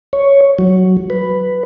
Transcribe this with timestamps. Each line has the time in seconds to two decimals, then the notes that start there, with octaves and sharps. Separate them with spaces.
0.13 C#5
0.59 F#3
1.10 B4